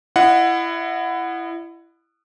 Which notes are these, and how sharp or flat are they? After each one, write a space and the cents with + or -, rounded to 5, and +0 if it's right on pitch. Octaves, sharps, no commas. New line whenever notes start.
E4 +20 D#5 -25 F#5 -10